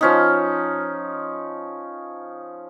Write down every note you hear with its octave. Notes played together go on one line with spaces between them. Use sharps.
F3 C#4 D#4